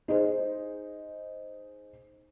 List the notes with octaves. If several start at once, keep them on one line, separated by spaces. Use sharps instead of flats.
D#4 G#4 C5